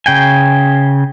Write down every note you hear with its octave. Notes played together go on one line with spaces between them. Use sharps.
C#3 G5 G#5